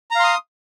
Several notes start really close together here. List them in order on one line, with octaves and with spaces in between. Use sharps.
A#5 F5 C6 D#6